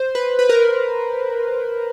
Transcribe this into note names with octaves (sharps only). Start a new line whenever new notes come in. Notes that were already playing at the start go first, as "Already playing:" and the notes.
Already playing: C5
B4
B4
A#4